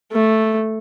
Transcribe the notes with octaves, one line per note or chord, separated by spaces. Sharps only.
A3